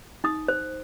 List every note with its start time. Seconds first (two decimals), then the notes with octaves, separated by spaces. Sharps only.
0.24 D#4 D#6
0.48 C5